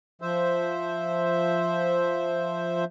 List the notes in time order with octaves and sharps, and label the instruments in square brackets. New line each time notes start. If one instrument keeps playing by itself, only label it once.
[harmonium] F3 C5 E5